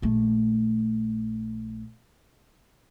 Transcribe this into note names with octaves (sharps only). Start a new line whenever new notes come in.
A#1 A3